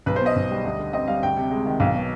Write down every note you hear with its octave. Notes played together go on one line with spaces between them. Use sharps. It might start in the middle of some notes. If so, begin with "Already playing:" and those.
B1 B4
C5
B2 D#5
B1
G3
D2
D3
C4 D#5
G3 F5
D2 G5
C3
G#3
D#3
B1 F5
B2